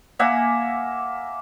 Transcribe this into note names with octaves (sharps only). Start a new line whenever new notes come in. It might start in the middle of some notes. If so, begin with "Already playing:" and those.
A#3 E5 F#5 G#5